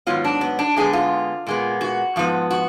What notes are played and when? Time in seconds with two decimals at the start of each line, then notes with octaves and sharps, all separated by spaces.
0.06 G#2 D#3 F#3 B3 F4
0.24 D4
0.41 B3
0.59 D4
0.76 D3 G#3 B3 G#4
0.93 F4
1.47 A#2 G#3 B3
1.81 F#4
2.16 G#2 F3 B3
2.51 F#4